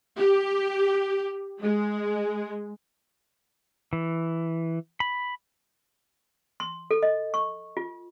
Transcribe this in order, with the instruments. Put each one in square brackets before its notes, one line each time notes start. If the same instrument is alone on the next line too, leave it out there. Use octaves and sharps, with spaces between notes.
[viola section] G4
G#3
[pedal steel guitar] E3
B5
[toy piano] C6
A4
D#5
C#6
F4